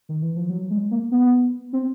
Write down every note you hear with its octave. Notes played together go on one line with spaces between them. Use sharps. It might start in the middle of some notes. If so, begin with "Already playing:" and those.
D#3
E3
F3
F#3
G#3
A#3
B3
C4